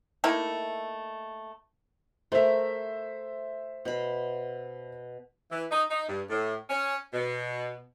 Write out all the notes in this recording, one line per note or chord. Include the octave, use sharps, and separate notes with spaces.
A3 A#3 D#4 E4
A3 A#4 C5 E5
B2 B5
E3
D#4
D#4
G2
A2
C#4
B2